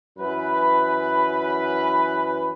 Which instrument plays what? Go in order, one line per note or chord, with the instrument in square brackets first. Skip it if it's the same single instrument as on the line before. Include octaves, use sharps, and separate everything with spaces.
[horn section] F#2 E3 B4